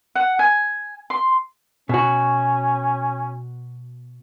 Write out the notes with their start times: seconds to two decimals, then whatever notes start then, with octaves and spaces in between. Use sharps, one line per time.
0.15 F#5
0.39 G#5
1.10 C6
1.89 B2 C#4 F#4